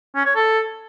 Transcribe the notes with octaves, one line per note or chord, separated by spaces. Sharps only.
C#4
C#5
A4